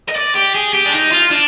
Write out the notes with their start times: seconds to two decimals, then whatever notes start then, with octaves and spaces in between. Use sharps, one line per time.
0.09 D#5
0.16 D5
0.35 G4
0.55 G#4
0.73 G4
0.86 D4
0.93 D#4
1.12 F4
1.31 D4